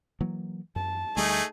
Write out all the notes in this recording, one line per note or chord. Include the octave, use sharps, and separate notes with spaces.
E3 F#3 A#3
F#2 A5
D2 G3 A3 D#4 G#4